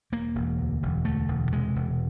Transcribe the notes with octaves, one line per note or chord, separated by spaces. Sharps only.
E1 A#3
E1
D2
E1
D2 A3
E1
C3 G#3
E1